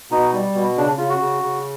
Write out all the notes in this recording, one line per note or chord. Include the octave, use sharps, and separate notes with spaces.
B2 D#4
G3
B2
C#3 D4
C#3 F4
F#4
C#3
C#3